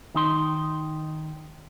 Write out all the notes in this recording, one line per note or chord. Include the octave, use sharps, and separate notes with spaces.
D#3 D#4 C6